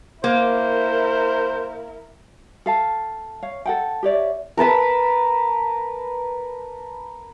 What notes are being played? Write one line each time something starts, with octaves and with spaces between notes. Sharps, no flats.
A#3 E4 A#4 C5
A4 F5 A5
C#5 F5
A4 F#5 G5
G4 C#5 D5 E5
A#4 B4 A5 B5